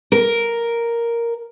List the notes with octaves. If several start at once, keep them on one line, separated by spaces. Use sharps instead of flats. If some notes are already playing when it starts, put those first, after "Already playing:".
A#4